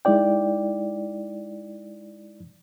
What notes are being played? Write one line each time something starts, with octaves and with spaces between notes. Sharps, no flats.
G#3 D#4 E4 D5 G5